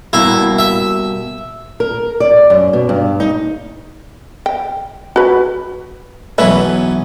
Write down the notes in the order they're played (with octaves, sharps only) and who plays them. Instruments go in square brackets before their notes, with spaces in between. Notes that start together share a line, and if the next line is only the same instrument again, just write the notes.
[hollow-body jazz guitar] B2 G3 A#3 [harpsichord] E4
[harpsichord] E5
[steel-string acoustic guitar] A#4
D5
F#2
B2
G2
D#4
[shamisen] G5
F#4 B4
[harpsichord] B1 E3 C#4 [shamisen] B4 E5